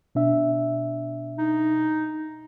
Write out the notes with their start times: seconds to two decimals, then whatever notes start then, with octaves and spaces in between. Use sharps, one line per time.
0.15 B2 D4 E5
1.39 D#4